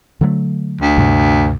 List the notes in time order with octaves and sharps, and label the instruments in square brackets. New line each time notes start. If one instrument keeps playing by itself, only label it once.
[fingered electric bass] D3 F#3 A3
[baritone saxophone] D2
[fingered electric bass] G2 C3